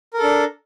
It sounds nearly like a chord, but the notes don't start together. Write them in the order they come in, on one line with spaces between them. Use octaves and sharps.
A#4 A4 D4